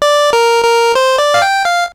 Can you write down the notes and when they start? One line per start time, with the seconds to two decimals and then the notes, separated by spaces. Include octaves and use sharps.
0.02 D5
0.33 A#4
0.64 A#4
0.95 C5
1.18 D5
1.34 F5
1.42 G5
1.65 F5